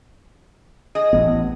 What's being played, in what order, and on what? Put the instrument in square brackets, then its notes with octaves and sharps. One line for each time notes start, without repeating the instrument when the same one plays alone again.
[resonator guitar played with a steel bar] G#4 D#5
[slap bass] A1 B3